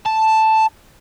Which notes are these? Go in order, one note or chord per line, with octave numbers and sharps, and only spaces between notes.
A5